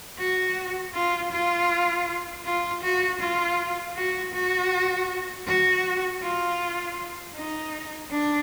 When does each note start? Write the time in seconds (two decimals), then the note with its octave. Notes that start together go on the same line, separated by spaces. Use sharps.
0.19 F#4
0.94 F4
1.32 F4
2.45 F4
2.83 F#4
3.21 F4
3.96 F#4
4.33 F#4
5.47 F#4
6.22 F4
7.35 D#4
8.11 D4